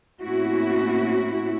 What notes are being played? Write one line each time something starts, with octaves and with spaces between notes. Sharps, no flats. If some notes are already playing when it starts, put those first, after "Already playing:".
A2 A#3 C4 C#4 E4 F#4